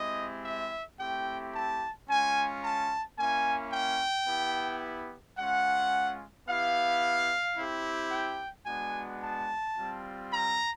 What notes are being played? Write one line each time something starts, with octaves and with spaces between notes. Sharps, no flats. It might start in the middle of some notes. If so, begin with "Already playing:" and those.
Already playing: G#3 C4 E4 G4 D#5
E5
A3 C4 E4 G4 G5
A5
G#3 C#4 F4 G#5
A5
A#3 C#4 E4 G#5
G5
B3 E4 G4
G#3 C#4 F4 F#5
B3 E4 G4 F5
C4 E4 G4
G5
G#3 B3 D4 F#4 G#5
A5
G3 C4 F4
A#5